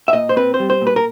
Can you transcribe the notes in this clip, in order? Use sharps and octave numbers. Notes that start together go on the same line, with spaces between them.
E5
A#2 D#5
C5
C4 B4
C5
G3
C5
A#2
B4
A#4